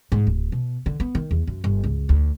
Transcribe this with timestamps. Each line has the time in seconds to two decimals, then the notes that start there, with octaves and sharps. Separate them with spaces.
0.12 G#2
0.27 D1
0.52 B2
0.86 D3
1.00 B3
1.15 D#3
1.31 E2
1.47 F#2
1.64 G1
1.84 C#2
2.09 D2